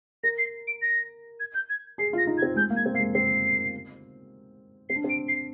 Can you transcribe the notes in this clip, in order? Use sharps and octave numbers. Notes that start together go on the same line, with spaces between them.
A#4 A#6
C7
D7
A#6
G#6
G6
G#6
G#4 C7
F4
A#6
D#4
G#6
C4
G#3 G6
A#3
G#6
C4
A#3 C7
G#3
C4 C7
C4 C7
D4
C4 D7
C7